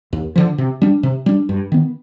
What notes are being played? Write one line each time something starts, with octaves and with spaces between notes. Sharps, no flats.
D#2
D3 F3
C3
G3 D4
C3
G3 D4
G2
D#3 B3